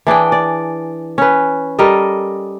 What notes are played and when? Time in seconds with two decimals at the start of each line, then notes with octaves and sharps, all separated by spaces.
0.07 E3 D4 G#4 G5
0.32 D5
1.18 C#4 B4
1.79 G3 A4 A#4 D#5